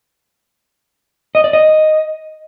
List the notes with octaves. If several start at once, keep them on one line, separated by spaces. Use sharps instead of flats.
D#5
D5
D#5